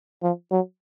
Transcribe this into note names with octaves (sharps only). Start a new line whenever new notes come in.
F3
F#3